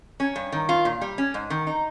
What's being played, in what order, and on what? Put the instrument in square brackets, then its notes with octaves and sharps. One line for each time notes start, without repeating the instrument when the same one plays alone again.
[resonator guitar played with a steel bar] C#4
G2
D#3
F4
A#2
G3
C#4
G#2
D#3
D#4